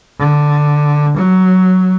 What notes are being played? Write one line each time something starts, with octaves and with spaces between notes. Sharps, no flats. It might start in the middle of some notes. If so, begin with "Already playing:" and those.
D3
F#3